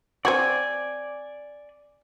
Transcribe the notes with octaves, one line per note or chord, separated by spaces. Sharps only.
C4 F#4 D5 G#5